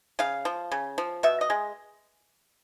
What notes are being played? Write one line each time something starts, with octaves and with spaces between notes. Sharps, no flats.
C#3 F5
F3
C#3
F3
B2 E5
D#5
G#3